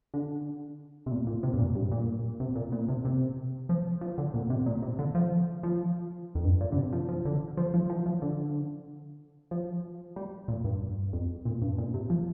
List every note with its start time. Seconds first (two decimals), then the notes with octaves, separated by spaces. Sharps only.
0.14 D3
1.06 C3
1.11 A#2
1.27 A#2
1.43 C3
1.54 G2
1.59 A#2
1.75 G2
1.92 A#2
2.40 C3
2.56 A#2
2.72 A#2
2.88 C3
3.05 C3
3.69 F3
4.01 F3
4.18 D3
4.34 A#2
4.50 C3
4.66 A#2
4.82 C3
4.99 D3
5.15 F3
5.63 F3
6.35 F2
6.44 G2
6.61 A#2
6.72 D3
6.77 C3
6.93 F3
7.09 F3
7.25 D3
7.57 F3
7.74 F3
7.90 F3
8.06 F3
8.22 D3
9.51 F3
10.16 G3
10.48 A#2
10.64 G2
11.13 F2
11.45 A#2
11.62 G2
11.78 A#2
11.94 C3
12.10 F3